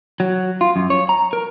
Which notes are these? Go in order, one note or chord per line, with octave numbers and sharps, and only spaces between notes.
F#3
F4
F#2
C#5
A#5
A#4